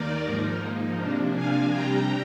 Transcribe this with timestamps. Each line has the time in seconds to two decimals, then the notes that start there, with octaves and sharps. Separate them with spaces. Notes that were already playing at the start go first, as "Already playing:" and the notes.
Already playing: D#2 D#3 A#3 D#4 A#4 D5
0.25 G#2 F3 A#3 D#4
0.98 C3 F3 A#3 D4
1.34 F5 G#5
1.71 C3 G3 D4 G5 A#5